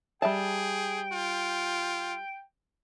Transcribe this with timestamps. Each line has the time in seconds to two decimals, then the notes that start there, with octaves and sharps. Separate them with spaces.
0.22 G3 G#4 E5 G5 A5
1.13 F4